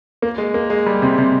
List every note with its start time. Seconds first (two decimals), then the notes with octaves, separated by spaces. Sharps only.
0.22 A#3
0.38 G#3
0.54 A#3
0.70 G#3
0.86 G3
1.02 C3
1.18 C3